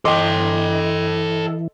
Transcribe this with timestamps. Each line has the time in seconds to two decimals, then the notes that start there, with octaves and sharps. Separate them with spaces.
0.05 E3 A4 D#5 G5 C6 D6